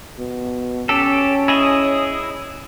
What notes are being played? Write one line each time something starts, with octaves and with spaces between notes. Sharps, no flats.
B2
C#4 G4 A4
E4 G#4 D#5